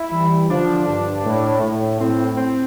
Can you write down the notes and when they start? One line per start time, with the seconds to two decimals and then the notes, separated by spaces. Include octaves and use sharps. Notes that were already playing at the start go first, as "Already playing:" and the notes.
Already playing: E4
0.12 E3 G3
0.50 D3 F3 D4
0.88 G2
1.25 A2
1.62 A2
2.00 A2 C4
2.37 C4